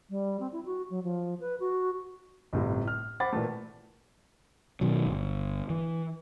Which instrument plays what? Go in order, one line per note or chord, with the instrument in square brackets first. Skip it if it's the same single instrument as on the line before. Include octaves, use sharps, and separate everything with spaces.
[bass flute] G3
C4
E4
F#4
F#3
F3
B4
F#4
[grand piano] G1 A2 C3
F6
C5 F#5 B5 D6 A6
A#2 E3 A3
[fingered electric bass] B2 D#3 F#3
G1
E3